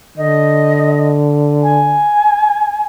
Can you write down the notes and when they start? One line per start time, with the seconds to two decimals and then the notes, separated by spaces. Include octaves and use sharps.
0.17 D3 D#5
1.63 G#5